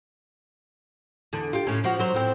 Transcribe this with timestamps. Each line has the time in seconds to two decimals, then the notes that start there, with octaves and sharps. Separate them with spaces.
1.33 E2 D3
1.53 F4 G4
1.67 A2 C#4
1.84 F3 F#4
1.99 F#3 C5
2.14 A2 C4